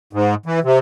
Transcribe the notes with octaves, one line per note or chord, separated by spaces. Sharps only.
G#2
E3
C3